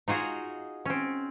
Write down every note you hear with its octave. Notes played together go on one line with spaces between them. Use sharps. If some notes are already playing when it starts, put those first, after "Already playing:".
D#4 F4 F#4 G#4
C4 C#4